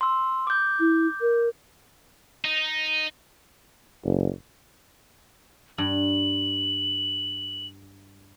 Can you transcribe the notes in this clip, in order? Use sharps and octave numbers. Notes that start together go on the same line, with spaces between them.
C6 E6
D6 G6
E4
A#4
D#4
F#1
G2 F#7